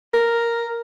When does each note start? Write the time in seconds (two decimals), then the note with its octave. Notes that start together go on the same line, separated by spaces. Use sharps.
0.14 A#4